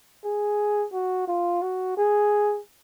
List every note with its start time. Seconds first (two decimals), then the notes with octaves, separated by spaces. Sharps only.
0.25 G#4
0.93 F#4
1.28 F4
1.62 F#4
1.97 G#4